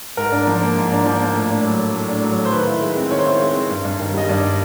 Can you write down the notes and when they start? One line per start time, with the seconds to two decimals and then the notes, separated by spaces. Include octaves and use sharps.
0.17 G#2 A#4
0.32 D4
0.47 F3
0.62 A#3
0.76 G#2
0.92 D4
1.06 F3
1.21 A#3
1.35 A2
1.50 D4
1.65 F#3
1.79 A3
1.94 A2
2.09 D4
2.23 F#3
2.38 A3
2.45 C5
2.52 D#3 B4
2.67 E4
2.82 G#3
2.97 C4
3.11 D#3 C#5
3.19 C5
3.26 E4 C#5
3.41 G#3
3.55 C4
3.70 G2
3.85 G2
4.00 D#3
4.14 G3 D#5
4.29 G2 D5